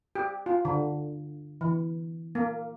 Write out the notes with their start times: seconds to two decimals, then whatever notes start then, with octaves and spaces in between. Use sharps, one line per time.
0.15 G4
0.46 F4
0.65 D3
1.61 E3
2.35 A#3